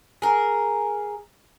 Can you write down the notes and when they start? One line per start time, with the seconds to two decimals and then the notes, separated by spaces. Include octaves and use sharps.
0.22 G#4 A#4